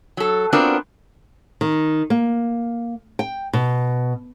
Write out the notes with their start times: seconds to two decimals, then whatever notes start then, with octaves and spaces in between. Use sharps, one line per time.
0.17 F#3 A4
0.53 B3 C4 D4 F4 F#4 A#4
1.61 D#3
2.10 A#3
3.19 G5
3.53 B2